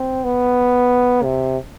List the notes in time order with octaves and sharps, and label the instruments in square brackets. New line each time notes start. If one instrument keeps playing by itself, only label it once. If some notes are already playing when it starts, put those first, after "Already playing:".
Already playing: [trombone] C4
B3
C3